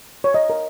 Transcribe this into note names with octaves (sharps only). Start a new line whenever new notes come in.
C#5
C#5 D#5
A#4